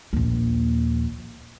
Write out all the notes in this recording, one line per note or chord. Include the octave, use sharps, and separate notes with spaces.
A#1 D#2